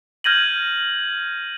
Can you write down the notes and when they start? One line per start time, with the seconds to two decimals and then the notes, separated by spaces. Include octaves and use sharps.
0.24 F6 G6 G#6 A#6 D#7 F#7